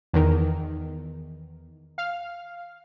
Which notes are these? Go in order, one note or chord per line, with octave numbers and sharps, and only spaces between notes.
E2 D#3
F5